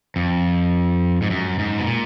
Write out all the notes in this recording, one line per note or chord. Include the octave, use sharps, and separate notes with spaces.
F2
G#2
F#2
G#2
B2
A#2